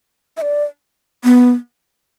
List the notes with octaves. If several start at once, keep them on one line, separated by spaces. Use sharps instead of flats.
E5
D5
B3